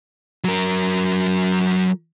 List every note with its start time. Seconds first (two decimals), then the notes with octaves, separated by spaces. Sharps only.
0.45 F#3 A#4